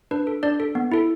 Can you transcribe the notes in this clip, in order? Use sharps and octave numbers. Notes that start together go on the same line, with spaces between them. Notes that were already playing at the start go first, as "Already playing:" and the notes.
D4 B4
A4
D4 D5
A4
B3
E4 A4